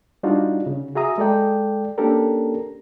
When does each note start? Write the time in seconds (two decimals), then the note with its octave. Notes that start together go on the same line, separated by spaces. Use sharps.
0.23 G3 D4 D#4 F4 F#4
0.66 C#3
0.95 F#4 G#4 E5 A#5 D#6
1.18 G#3 A4 D5 G5
1.98 A#3 C#4 D4 G4 A4 A#4